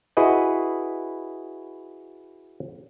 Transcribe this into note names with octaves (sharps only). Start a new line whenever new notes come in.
E4 F#4 G#4 B4 D#5